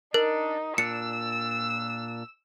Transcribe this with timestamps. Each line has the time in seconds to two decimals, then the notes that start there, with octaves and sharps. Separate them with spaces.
0.14 D4 D#4 A#4
0.78 A#2 D4 E6 C#7